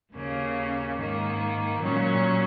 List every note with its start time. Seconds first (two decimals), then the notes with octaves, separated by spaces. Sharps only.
0.14 D#2 C#3 A#3 C#4
0.98 G#2 D#3 A#3
1.80 A#2 F#3 C#4